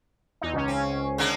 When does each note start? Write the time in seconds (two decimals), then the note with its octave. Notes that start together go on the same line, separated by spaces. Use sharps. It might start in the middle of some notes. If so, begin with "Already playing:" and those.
0.41 E2 D#4
0.53 C#2 C#4
0.68 C4
1.18 D3 G#3 A#3